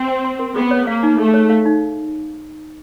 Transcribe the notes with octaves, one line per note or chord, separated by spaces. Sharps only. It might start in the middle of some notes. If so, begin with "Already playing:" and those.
Already playing: C4
G5
C6
A#4
B3 G#4
C#5
A#3 F5
D#4
A3 G#4
C#5
F5
D#4